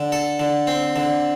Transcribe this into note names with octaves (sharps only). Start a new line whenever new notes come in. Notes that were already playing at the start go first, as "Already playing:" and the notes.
Already playing: D3
A4
D3
C4
D3